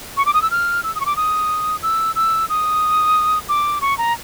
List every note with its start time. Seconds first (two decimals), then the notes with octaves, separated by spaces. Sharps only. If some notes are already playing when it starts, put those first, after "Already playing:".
0.17 C#6
0.26 D6
0.34 D#6
0.42 E6
0.51 F6
0.83 E6
0.95 D#6
1.00 C#6
1.06 D6
1.16 D#6
1.83 E6
2.16 E6
2.49 D#6
3.49 D6
3.81 C#6
3.98 A#5